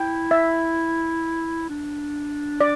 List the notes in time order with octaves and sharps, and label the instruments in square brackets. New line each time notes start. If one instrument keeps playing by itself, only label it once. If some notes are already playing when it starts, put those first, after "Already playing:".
Already playing: [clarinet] E4 [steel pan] G5
[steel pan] E5
[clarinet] D4
[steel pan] D5